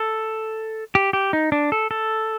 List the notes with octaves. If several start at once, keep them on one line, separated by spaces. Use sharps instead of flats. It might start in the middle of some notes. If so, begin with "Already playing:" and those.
Already playing: A4
G4
G4
D#4
D4
A4
A4